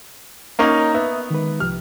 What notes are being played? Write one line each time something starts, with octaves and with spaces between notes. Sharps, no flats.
A#3 C#4 D#4
B3 E5
D#3 G#3 B4
C2 F3 G4 F6